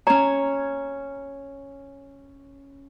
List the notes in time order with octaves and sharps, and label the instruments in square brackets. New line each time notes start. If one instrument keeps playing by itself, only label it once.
[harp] C#4 C#5 [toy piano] A#5